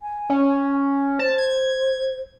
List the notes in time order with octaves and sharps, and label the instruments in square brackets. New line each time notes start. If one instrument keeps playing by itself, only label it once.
[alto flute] G#5
[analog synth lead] C#4
[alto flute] C5 [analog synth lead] A5
[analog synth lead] G#6